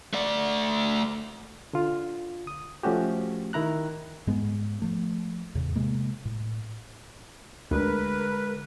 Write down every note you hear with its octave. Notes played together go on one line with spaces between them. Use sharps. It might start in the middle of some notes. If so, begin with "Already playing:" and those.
A3 D5
D3 F4
D#6
F3 A3 C#4 F#4 G4
D#3 E4 A#5 F#6
G#2 G#3 B3
F3 A3
E2 A2 C#3
C3 G#3 A#3
A2
D2 D3 G#3 A#4 B4